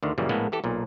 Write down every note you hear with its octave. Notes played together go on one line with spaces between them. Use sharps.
D2 D3 D#3
F#2 A#2 C#3 E3 F3 G3
A#1 A2 G#3 A#3 B3 A4
E3 G4 A4
B1 A#2